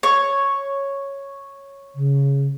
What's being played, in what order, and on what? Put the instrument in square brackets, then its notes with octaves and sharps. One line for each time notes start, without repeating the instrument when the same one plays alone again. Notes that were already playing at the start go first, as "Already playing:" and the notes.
[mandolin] C#5
[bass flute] C#3